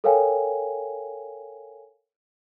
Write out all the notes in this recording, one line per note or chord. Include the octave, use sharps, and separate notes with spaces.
A4 A#4 C#5 F5 G5 G#5